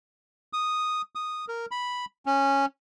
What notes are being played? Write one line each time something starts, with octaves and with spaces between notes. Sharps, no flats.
D#6
D#6
A#4
B5
C#4